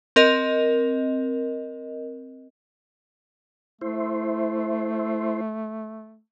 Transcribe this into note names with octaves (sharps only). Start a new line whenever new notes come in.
C4 A#4 D#5
A3 E4 C5